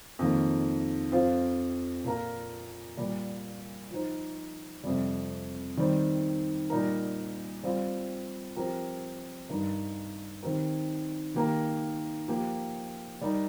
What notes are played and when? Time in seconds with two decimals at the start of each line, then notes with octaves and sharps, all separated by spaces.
0.19 F2 D#3 A#3
1.12 F2 F3 C4 F4 C5
2.04 A#2 A#3 F4 A#4
2.97 A#2 G3 A#3
3.90 F3 D#4 C5
4.84 F2 C3 G3
5.77 D#3 G3 C4
6.70 A#2 G3 D#4 A#4
7.63 G3 C4 F4
8.57 F3 C4 G4 A#4
9.49 G2 G3 D#4 A#4
10.43 D#3 C4 G4 A#4
11.34 D#3 A#3 G4 A#4
12.27 F3 A#3 G4
13.21 G3 D#4 A#4